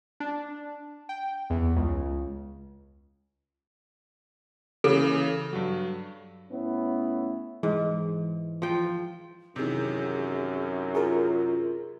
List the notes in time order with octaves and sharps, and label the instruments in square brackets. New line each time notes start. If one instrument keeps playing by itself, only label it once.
[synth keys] D4
G5
E2
C#2
[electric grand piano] C#3 E3 A#3 [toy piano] A4
[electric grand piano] G2 F#3
[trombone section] A2 B3 C#4 E4
[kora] G#2 [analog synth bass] E3
[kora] F3 G5
[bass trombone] F#2 [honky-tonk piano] C3 D#3 E3 [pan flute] G#4
[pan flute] F4 [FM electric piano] G#4 A#4